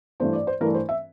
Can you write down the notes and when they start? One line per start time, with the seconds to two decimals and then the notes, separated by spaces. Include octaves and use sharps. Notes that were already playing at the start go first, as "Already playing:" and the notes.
0.20 G2 E3 A3 D4 C5
0.33 D5
0.47 C5
0.61 G2 E3 A3 D4 A#4
0.74 C5
0.89 E5